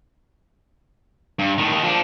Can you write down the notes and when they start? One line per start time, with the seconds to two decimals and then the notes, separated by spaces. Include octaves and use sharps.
1.39 G2
1.58 A2 D#3
1.70 D#2 D#3
1.84 F3 D4